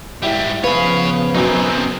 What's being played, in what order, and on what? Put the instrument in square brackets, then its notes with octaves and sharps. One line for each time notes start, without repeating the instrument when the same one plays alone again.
[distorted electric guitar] G#2 G3 [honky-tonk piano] E4 G4
[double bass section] C#3 F3 B3 [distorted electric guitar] G#4 C#5 [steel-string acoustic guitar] B4 [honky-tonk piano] F5
[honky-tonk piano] F#2 B2 F#3 [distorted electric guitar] C4 D#4